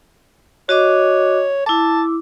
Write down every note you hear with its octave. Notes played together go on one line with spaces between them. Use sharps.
F#4 C#5 D#5 D6
E4 A5 D6